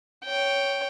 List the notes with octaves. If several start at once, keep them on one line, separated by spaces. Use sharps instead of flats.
C#5 G5